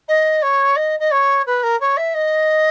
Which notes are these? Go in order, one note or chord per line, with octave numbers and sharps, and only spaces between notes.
D#5
C#5
D#5
D#5
C#5
B4
A#4
C#5
E5
D#5